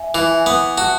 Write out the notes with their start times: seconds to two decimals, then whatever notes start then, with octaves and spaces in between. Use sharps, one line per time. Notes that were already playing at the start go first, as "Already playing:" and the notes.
Already playing: E5 G#5
0.15 E3
0.30 E5 G#5
0.46 B3
0.77 F#4 F#5 A5